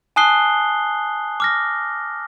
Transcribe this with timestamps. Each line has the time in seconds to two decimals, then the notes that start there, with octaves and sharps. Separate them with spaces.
0.16 G#5 A5 D#6 F#6 C7 G7
1.40 D6 F6 A#6